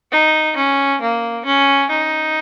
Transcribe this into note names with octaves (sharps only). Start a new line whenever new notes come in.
D#4
C#4
A#3
C#4
D#4